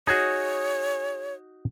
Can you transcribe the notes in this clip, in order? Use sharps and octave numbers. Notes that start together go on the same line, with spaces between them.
D#4 F#4 G#4 C#5